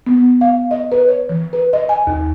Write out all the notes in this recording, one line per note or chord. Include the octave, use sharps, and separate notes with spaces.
B3
F5
D#5
B4
C#5
E3
B4
D#5
G#5
D#2